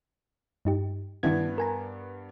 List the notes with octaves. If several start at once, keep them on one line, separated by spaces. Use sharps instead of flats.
G2 D#4 G4
G2 D#3 B3 D4 E4 G#6
A#4 G#5 A#5